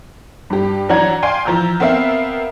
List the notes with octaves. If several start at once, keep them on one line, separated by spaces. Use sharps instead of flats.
G2 G4
E3 F#3 D4 F#5 A#5 G#6
D5 F5 G5 G#5 C6
E3 F3 A#5 E6 G6
B3 C4 A#4 E5 F5